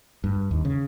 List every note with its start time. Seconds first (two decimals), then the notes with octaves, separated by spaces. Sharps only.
0.24 G2
0.51 D#2
0.65 C#3